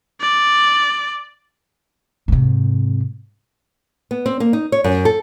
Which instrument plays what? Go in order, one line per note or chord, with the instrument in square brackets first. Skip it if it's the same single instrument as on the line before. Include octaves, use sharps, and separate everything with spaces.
[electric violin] D5
[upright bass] G#2 C3
[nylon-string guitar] B3
C4
A#3
D#4
C#5
F#2
A4